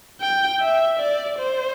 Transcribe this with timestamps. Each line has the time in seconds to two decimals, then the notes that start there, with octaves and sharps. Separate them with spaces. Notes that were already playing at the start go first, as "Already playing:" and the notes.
0.21 G5
0.60 E5
0.99 D5
1.39 C5